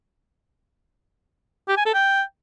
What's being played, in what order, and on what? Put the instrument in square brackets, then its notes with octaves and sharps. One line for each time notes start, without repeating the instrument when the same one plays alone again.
[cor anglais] G4
G#5
A4
G5